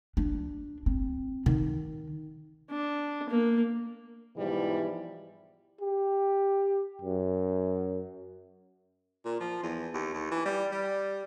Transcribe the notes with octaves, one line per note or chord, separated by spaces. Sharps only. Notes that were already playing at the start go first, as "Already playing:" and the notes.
D4
C4
D#3
D4
A#3
G#2 B2 E3 F3 G3 E4
G4
F#2
A#2
F3
E2
D#2
D#2
E3
G3
G3